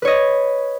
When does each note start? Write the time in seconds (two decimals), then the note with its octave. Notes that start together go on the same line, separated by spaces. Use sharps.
0.02 B4
0.05 C#5
0.08 D#5